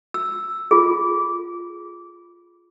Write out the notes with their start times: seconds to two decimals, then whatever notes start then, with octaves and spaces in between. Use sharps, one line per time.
0.14 E6
0.71 F4 G#4